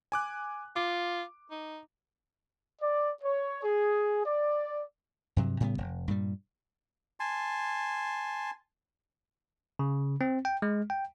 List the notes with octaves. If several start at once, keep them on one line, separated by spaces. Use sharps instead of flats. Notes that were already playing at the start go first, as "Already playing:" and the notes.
G#5 D6 F#6
F4 D6
D#4
D5
C#5
G#4
D5
G2 C3 F#3
A2 C#3 G3 B3
F1
G2 A#2 G3
G#5 A5 C6
C#3
C4
G5
G#3
G5